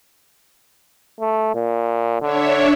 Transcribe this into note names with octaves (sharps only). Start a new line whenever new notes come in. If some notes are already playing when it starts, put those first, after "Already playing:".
A3
A#2
D3 D4 C#5 E5